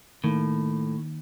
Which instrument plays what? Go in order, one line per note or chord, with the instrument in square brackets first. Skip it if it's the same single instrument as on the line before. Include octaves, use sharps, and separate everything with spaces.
[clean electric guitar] A2 [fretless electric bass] D#3 A#3